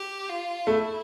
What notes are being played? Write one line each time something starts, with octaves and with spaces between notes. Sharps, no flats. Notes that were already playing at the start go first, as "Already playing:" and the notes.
Already playing: G4
F4
A3 E4